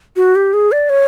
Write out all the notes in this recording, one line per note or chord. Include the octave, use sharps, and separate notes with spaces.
F#4
G4
G#4
D5
C#5